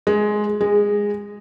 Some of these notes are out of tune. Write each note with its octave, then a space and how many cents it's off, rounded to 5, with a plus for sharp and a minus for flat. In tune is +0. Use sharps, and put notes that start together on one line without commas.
G#3 +10
G#3 -15